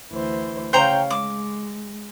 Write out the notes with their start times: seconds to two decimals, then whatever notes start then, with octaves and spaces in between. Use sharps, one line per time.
0.12 D2 E3 C5
0.73 C#3 C5 C#5 F5 G5 A#5
1.11 G#3 D6